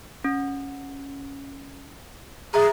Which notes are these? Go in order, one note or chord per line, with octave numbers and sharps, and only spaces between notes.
C#4
G#4 E5 A#5